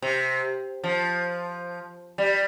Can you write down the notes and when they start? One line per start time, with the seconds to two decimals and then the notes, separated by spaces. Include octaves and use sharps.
0.02 C3
0.84 F3
2.18 G3